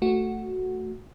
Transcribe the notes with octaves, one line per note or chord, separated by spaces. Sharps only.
A3 F#4